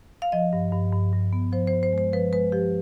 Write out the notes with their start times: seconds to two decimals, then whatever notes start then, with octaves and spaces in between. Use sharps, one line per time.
0.22 F5
0.32 F3 D#5
0.53 G2
0.73 G2
0.93 G2
1.13 G2
1.33 B3
1.52 F3 C5
1.67 C5
1.73 G2
1.83 C5
1.93 G#3 C5
2.13 F3 B4
2.33 G#3 B4
2.52 F3 G4